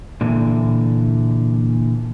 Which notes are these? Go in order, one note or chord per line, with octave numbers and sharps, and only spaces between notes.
A#2 D3 E3